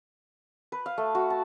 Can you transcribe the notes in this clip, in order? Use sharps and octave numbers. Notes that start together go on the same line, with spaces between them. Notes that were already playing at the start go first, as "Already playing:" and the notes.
B4
F5
A3
F#4
A5